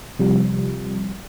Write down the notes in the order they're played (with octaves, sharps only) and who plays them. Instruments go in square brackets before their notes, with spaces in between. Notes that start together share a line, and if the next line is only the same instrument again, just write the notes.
[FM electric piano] C3 F3 G3